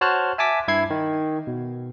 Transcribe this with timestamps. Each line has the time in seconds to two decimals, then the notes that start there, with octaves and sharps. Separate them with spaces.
0.01 F#4 C5 C#5 A5 F6 F#6
0.38 E5 G#5 A5 D6 B6
0.68 G2 E4 G#6 C7
0.90 D#3
1.47 B2